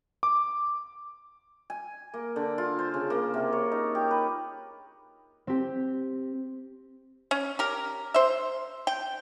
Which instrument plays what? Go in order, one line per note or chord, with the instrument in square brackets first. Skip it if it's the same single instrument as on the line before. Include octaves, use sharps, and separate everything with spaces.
[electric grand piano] D6
[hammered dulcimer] G#5
A#3
D3
F4
C5
C#3
A#3
C3
C#5
D#4
G4
B4
[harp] C4 G4
[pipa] C#4
G4 A#4
C5 E5
G5